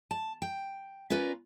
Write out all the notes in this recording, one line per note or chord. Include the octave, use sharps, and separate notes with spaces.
A5
G5
C#4 F4 A#4 B4 D5